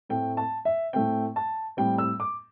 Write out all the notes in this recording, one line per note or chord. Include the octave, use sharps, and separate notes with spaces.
A2 A3 C4 G5
A5
E5
A2 A3 C4 G5
A5
A2 G3 C4 G5
E6
D6